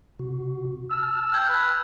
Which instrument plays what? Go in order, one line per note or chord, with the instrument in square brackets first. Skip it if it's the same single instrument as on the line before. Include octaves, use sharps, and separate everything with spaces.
[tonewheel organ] C3 F#4
[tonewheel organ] A5 F6 [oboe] E6
[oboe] G5 [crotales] E6 G#6
[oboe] B4